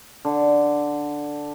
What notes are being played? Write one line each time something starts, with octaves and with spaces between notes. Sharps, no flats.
D3